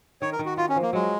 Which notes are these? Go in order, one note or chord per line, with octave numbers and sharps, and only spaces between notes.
D#3 C#5
A#4
D#3
F#4
F4 F#4
C#4
F3
A#3
F#3 G#3